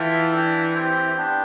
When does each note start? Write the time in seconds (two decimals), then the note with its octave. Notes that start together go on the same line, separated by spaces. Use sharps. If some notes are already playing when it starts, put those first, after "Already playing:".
Already playing: E3 F4 A4 E5 G5
0.32 D4 A4 E5 G5
0.75 C4 G4 C5 G5
1.17 B3 D4 G4